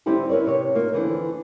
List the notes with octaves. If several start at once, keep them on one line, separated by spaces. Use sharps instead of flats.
D3 G3 C4 E4 G4 A4
B3 E4 A#4 C#5 D5
C3 C#5
A#3 D#4 F4
F2 D3 E3 C4